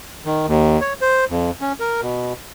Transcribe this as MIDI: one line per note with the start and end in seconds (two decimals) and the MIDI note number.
0.25 0.46 51
0.47 0.80 39
0.81 0.93 73
1.01 1.25 72
1.29 1.51 41
1.61 1.73 61
1.80 2.01 70
2.02 2.33 47